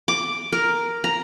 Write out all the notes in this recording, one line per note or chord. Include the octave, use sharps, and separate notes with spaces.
D6
A#4
A#5